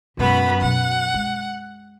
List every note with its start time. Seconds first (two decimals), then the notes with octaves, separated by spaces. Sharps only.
0.17 F#2 B2 G#3 B3 B5
0.61 B2 F#3 F#5
1.14 G#3